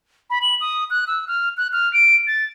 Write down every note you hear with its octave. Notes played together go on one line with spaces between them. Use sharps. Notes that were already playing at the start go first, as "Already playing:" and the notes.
B5
F#7
D#6
F#6
E6
F6
F#6
F6
D7
A6